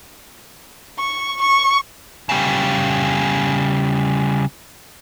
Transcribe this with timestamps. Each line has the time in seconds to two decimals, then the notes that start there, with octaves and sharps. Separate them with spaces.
0.99 C#6
1.41 C#6
2.29 C#3 G3